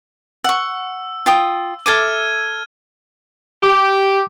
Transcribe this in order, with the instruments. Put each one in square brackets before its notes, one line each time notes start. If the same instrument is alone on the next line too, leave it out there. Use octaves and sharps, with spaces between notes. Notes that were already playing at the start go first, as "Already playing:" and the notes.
[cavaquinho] F#5 C#6 [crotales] E6
[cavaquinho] F4 G5 D#6
[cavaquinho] A4 E5 D6 [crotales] F6 G#6 D#7
[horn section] G4 [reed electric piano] D6